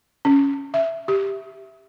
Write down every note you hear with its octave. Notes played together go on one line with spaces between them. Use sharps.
C#4
E5
G4